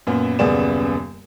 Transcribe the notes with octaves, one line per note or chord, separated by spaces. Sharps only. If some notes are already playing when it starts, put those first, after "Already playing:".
F#2 A#2 B3
D#1 F#2 C#3 B3 D5 E7